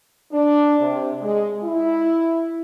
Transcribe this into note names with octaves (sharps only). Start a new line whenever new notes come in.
D4
C3
G#3
E4